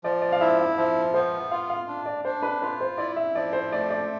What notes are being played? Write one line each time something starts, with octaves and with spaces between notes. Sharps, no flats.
F3 D5
D5
F5
E4 E5
F5
F3 E5
B3 C5
F4 F5
F5
D4
D5
D4 C5
B4
F4 B4
C5
E4 D5
E5
F3 D5
C5
A3 D5
D5